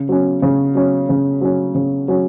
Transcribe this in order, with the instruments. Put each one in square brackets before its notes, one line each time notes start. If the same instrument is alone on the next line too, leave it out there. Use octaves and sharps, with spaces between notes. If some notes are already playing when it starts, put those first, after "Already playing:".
Already playing: [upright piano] C#3
F#3 C#4
C#3
F#3 C#4
C#3
F#3 C#4
C#3
F#3 C#4